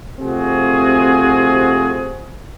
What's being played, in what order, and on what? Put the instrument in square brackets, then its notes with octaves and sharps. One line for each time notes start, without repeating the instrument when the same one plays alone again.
[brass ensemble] C3 F3 A3 C4 F#4 G#4